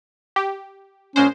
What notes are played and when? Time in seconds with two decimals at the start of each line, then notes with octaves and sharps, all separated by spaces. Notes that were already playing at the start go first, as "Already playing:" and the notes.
0.36 G4
1.16 A#1 G#3 C#4 C5